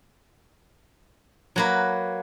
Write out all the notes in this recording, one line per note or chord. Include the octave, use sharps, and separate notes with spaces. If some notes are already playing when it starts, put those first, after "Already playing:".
F#3 A#3 B4